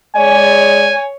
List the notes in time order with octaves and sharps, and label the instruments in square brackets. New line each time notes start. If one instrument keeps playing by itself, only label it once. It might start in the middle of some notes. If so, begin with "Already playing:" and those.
[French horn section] G#3 D5 [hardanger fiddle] C#5 [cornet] G#5